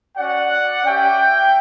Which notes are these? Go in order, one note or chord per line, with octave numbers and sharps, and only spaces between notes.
C#4 F#4 D5 F#5
C#4 G4 E5 G5